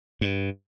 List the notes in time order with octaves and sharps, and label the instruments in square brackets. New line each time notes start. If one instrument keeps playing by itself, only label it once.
[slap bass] G2